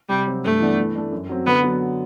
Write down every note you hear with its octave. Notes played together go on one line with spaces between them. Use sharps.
C3 G3
F#3 C4 F#4
G2 A3
E3 B3 D4
E3
A3 D4
F#2
F#3 C4
D3 B3
F#3 B3